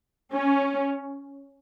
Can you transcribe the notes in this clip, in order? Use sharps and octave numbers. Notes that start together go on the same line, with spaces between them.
C#4